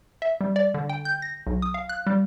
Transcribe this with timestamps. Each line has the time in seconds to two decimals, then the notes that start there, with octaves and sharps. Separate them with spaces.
0.22 E5
0.41 G3
0.56 D5
0.74 D3
0.89 G5
1.05 G6
1.22 A#6
1.47 B1
1.62 D#6
1.74 F5
1.89 F#6
2.07 G3